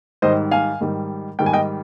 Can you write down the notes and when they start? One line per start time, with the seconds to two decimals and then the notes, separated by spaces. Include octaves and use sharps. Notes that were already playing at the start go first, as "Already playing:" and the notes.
0.22 G#2 D#3 G3 C5 D#5
0.51 F5 G#5
0.81 G#2 D#3 G3
1.39 G#2 D#3 G3 G5
1.46 G#5
1.53 D#5 G5